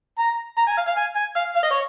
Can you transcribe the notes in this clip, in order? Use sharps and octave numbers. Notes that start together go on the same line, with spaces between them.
A#5
A#5
G#5
F5
F5
G#5
G#5
F5
F5
D#5
C#5